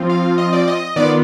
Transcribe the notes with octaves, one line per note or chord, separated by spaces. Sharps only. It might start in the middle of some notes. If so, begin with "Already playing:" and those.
Already playing: F3 C4 F4
F5
D#5
D5
D#5
D#3 B3 F4 D5